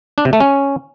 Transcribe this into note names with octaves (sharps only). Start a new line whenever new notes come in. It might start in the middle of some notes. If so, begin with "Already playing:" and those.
D4
C3
A3
C#4